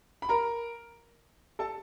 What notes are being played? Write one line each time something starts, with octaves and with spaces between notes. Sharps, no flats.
B5
A#4 A#5
A4 A5